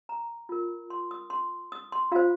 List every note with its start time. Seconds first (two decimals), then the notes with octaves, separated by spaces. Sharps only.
0.09 A#5
0.49 F4 A#4
0.90 C6
1.11 D#6
1.30 C6
1.72 D#6
1.92 C6
2.12 F4 C5 F5